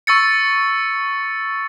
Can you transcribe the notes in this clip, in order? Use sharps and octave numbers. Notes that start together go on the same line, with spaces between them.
C#6 E6 A6 C#7